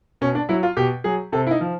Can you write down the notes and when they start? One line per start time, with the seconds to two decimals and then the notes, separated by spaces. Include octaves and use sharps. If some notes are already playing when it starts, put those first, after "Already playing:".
0.21 B2 C#4
0.35 D4
0.49 F#3 E4
0.63 F4
0.77 B2 G4
1.04 F#3 G#4
1.32 C3 A4
1.47 E4
1.51 D#4
1.61 F3